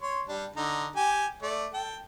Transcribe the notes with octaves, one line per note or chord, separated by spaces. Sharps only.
C#5 C6
G3 D4
D3 D#4
G4 G#5
A3 D5
A4 G5